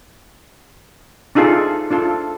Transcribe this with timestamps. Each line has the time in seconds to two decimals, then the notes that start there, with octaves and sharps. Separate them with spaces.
1.35 D4 D#4 F4 G#4 A4
1.91 D4 F4 A4